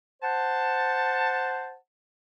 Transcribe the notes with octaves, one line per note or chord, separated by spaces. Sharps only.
C5 F#5 A5